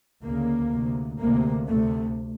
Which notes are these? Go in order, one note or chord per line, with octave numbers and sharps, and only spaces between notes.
D2 C#3 A#3
D2 C3
D2 C3 A#3
D2 C3 A3